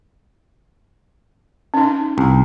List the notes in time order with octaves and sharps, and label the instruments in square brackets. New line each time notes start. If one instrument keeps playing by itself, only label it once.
[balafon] C#4 D#4
[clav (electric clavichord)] C2